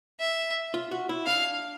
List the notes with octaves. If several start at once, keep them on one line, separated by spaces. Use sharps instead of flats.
E5
F4
F#4
E4
D4 F5